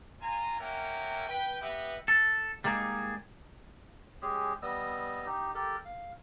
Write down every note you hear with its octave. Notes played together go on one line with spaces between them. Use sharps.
F4 G#5 A#5
A#3 C#4 A#4 E5 F#5 G5
B4 G5
B3 G4 B4 D#5 E5 F#5
A4
G3 G#3 A#3 D#4 G#4
G#3 C#4 G4 G#4
G3 B3 D#5 E6
D#4 G4
G4 A4 A#4
F5